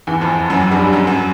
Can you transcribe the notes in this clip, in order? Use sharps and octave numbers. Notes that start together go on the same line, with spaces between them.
E2 E3
F2 F3
F#2 F#3
G2 G3
F#2 F#3
F#2 F#3